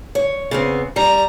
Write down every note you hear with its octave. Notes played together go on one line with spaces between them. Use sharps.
C#5
C#3 B3 C4
G3 A#5